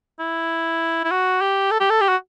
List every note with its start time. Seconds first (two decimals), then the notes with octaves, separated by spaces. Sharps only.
0.20 E4
1.04 E4
1.11 F#4
1.41 G4
1.71 A4
1.80 G4
1.90 A4
2.01 G4
2.09 F#4